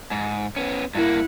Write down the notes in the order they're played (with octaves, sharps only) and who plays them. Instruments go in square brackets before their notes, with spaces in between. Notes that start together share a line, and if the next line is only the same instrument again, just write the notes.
[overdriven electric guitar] G#2
B3 C#4
[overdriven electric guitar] G2 A#3 [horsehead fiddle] E4 F#5